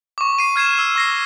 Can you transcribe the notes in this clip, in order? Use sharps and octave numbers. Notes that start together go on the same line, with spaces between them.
C#6 D6
C7 D#7
F6 G#6 C7 E7
E6 C7
C#6 A#6 C7